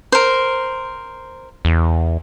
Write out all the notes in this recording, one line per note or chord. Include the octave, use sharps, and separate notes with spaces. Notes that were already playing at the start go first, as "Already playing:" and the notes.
A#4 C5
E2